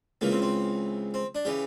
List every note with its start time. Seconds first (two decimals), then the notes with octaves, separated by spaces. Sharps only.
0.21 C#2 C#3 E3 A#3
0.31 C4
0.42 C4
1.14 C4
1.35 D4
1.45 C#3 E3 G4